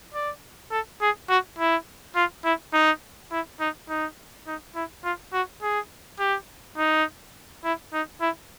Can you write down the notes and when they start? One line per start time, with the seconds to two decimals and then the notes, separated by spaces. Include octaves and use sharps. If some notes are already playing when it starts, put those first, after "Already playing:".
0.14 D5
0.71 A4
1.01 G#4
1.29 F#4
1.59 E4
2.16 F4
2.45 E4
2.74 D#4
3.32 E4
3.61 D#4
3.89 D#4
4.47 D#4
4.76 E4
5.04 F4
5.33 F#4
5.62 G#4
6.19 G4
6.78 D#4
7.64 E4
7.93 D#4
8.21 E4